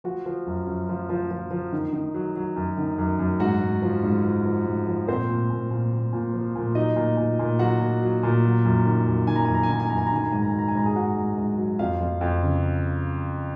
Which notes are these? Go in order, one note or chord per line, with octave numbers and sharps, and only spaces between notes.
F3 F#4 F#5
F3
F#2
F#2
F3
F3
F3
F3
D#3
D#3
F#3
F#3
F#2
D#3
F#2
F#2
G#2 F#4 F#5
G#2
F3
G#2
F3
F3
G#2
F3
A#2 C4 C5
A#2
A#2
A#2
A#2
A#2
F3
A#2
F#3 D#4 D#5
A#2
A#2
A#2
F#3 F#4 F#5
A#2
F#3
A#2
F#3
F#2
D#3
F#2
D#3 G#5
A#5
F#2 G#5
A#5
G#5
D#3 A#5
G#5
F#2 A#5
G#5
A#5
D#3 G#5
A#5
G#2 G#5
A#5
F#3 G#5
A#5
G#5
G#2 A#5
G#4 G#5
G#2 F#4 F#5
G#2
G#2
F#3
F2 F4 F5
F2
F2
C#3